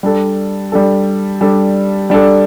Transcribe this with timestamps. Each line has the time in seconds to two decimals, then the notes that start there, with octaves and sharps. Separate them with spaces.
0.03 G3 D4 A4
0.72 G3 D4 A4
1.41 G3 D4 A4
2.10 G3 D4 A4